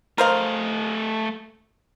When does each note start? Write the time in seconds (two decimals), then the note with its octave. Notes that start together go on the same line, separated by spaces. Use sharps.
0.18 A3 A#4 C5 D#5 F5